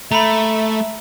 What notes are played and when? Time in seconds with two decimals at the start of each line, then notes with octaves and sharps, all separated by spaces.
0.12 A3 E5 A#5 B5